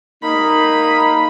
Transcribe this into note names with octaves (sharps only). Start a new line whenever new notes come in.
A#3 D#4 B5